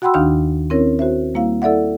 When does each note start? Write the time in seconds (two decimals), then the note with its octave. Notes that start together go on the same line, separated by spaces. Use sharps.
0.02 F#4 F#5 G5 B5 C6 E6
0.14 D#2 D#3 D4 D#4 F5 F6
0.70 C4 C#4 E4 A#4 C#5
0.99 F#4 C5 E5
1.34 G3 A#3 E4 F5
1.62 E4 A4 D5 E5 F#5